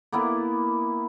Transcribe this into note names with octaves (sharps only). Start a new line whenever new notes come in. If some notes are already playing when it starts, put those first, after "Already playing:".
A#3 B3 E4